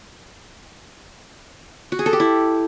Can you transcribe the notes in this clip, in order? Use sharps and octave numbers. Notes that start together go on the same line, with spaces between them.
F#4
G#4
A4
G4
E4